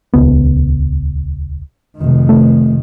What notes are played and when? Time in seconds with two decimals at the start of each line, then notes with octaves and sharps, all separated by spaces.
0.14 D#1 C#2 B3
1.97 F1 D#3
2.29 A3